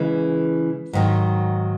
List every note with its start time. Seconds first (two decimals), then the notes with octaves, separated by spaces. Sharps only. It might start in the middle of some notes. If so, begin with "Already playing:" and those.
Already playing: C#3 E3 G#3
0.93 G#2 D#3 F#3